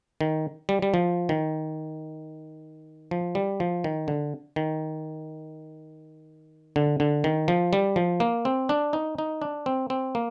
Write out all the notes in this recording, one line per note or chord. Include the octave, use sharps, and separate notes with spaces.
D#3
G3
G3
F3
D#3
F3
G3
F3
D#3
D3
D#3
D3
D3
D#3
F3
G3
F3
A#3
C4
D4
D#4
D#4
D4
C4
C4
A#3